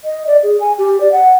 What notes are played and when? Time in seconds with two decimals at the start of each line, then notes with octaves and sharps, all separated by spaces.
0.04 D#5
0.27 D5
0.43 G#4
0.61 G#5
0.78 G4
1.01 D5
1.12 F#5